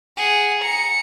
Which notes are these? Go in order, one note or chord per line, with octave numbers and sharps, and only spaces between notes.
G#4 F#5
A#5 C#7